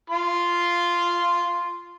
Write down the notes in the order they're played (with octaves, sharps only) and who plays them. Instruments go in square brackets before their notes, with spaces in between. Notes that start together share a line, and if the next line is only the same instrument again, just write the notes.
[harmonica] F4 C6